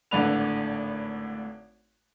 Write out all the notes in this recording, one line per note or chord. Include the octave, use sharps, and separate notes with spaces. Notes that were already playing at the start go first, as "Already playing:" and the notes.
G#1 A2 D3 D4 B4 F7